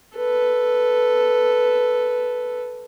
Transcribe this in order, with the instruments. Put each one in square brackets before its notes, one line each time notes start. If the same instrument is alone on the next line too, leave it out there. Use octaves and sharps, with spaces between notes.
[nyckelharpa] A4 B4